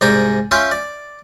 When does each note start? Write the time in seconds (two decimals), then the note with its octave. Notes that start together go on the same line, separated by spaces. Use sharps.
0.01 C2 G#2 D5 G5 G#5 A#5
0.51 C#4 F4 E5 F5 G5 C6
0.71 D5